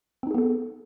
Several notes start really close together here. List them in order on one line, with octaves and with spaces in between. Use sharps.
C4 D#4 G#4 B3 A4